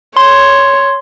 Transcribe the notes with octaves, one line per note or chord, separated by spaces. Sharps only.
C#5 C6